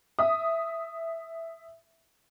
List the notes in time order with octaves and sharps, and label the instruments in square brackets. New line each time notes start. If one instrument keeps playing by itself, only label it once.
[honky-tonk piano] E5 D#6